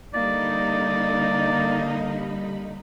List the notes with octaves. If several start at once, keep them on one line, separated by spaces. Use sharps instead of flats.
D3 G3 A#3 D#4 D5 B5